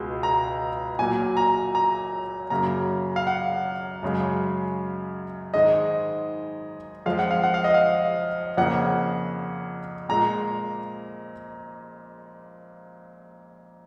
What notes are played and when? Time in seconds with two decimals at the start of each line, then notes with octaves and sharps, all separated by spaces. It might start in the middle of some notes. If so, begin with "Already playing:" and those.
Already playing: C#2 B2 G#3
0.23 A#5
0.99 A#2 F#3 A#3 G#5
1.37 A#5
1.75 A#5
2.50 F#2 C#3 F#3 A#3 A#5
3.16 F5
3.27 F#5
4.03 F#2 C#3 G#3
5.54 G#2 D#3 G#3 D#5
7.06 F2 F3 G#3 F5
7.19 F#5
7.31 F5
7.43 F#5
7.54 F5
7.64 D#5
7.74 F5
8.57 F2 C#3 F3 A#3 F#5
10.09 A#2 G#3 A#5